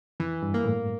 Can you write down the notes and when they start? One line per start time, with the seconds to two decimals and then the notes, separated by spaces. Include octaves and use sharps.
0.20 F2 E3
0.43 G2
0.54 A#3
0.65 A2